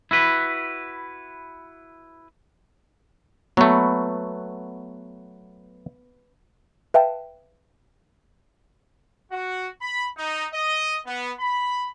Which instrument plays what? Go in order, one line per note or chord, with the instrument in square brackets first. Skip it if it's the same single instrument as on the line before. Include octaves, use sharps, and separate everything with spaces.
[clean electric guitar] E4 F#4 B4
[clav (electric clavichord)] F#3 A3 [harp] B3
[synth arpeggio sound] B4 E5 F5 G5 A5
[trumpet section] F#4
B5
D#4
D#5
B3
B5